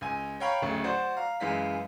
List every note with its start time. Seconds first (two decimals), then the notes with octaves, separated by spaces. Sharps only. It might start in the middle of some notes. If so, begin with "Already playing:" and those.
0.01 C#2 G#5
0.40 C#5 F5 G5 A#5 B5 C#6
0.62 D1 C#3 A3
0.84 F#4 C5 D5
1.17 F5 A#5
1.40 F#2 E3 G#3 F5 B6